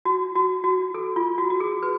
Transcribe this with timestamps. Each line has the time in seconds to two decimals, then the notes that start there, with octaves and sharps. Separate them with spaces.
0.05 F#4
0.35 F#4
0.64 F#4
0.94 A4
1.16 F4
1.38 F#4
1.50 F#4
1.60 G#4
1.83 B4